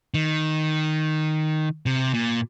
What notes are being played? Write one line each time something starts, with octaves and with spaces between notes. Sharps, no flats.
D#3
C3
A#2